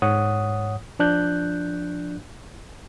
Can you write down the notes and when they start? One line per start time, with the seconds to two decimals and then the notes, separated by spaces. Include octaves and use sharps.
0.02 G#2 C#5 F#5 D#6
0.99 F3 D4 F#6 G6